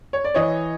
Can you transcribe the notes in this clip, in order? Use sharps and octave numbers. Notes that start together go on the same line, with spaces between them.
C#5
D5
E3 C#5 D#5